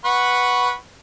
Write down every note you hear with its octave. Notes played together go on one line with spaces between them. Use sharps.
B4 F#5 C#6